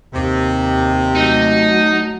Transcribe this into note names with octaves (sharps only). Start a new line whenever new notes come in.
D#2 C3
F#3 A3 D#4